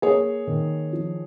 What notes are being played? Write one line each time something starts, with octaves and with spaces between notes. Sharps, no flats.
A#3 G#4 C#5
D#3
F3